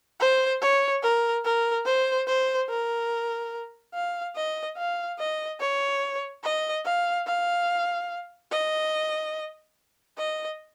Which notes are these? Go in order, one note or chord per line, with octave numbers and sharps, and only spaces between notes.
C5
C#5
A#4
A#4
C5
C5
A#4
F5
D#5
F5
D#5
C#5
D#5
F5
F5
D#5
D#5